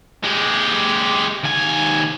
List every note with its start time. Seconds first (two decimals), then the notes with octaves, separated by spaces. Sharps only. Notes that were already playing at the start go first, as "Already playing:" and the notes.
0.23 G#3 G4
1.44 D#2 G#5